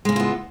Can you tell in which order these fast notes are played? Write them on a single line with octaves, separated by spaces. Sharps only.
G#3 C#3 E4 F4 B3